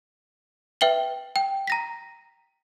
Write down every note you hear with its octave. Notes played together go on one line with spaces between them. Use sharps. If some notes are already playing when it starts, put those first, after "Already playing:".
B4 E5 G5 F#7 G7
G5
A#5 A#6 B6